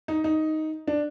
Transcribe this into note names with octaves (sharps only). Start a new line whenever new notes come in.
D#4
D#4
D4